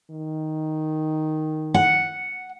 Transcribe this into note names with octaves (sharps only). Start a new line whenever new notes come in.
D#3
F#5